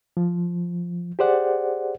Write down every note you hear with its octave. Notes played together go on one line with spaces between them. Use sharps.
F3
G4 G#4 C5 D5 F#5